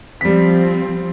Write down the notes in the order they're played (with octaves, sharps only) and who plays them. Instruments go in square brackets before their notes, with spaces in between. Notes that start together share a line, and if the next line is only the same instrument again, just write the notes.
[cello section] F3 C4 [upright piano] G3 B6